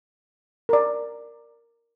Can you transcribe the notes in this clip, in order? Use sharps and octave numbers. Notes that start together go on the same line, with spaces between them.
A#4 D5